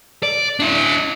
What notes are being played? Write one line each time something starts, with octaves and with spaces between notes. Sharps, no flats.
D5
D4 E4